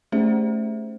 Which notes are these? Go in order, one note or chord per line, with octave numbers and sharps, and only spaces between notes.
A3 C#4 G#4 C5 E5